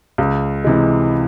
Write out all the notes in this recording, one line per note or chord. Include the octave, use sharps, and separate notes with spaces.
C#2
C3 E3 G#3